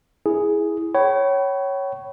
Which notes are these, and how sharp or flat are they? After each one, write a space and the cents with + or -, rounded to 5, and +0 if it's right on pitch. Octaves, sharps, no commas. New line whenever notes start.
E4 -5 G#4 +0
C#5 +0 G5 -45 B5 +0